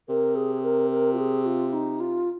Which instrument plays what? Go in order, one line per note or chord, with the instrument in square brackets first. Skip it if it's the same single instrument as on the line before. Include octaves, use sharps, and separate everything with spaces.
[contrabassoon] C3 [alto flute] A#4
[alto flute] G#4
A#4
A#4
F4
G#4
F4
D#4
F4